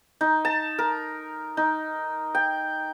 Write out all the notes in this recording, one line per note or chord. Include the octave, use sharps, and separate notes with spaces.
D#4
A5
A#4
D#4
G5